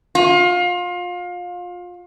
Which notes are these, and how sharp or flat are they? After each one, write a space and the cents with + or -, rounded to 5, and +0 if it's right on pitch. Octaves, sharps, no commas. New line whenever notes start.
F4 +25